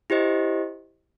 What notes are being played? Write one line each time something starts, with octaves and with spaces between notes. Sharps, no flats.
E4 G4 C5 D#5